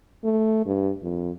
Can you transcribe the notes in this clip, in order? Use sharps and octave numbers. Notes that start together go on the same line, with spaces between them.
A3
G2
F2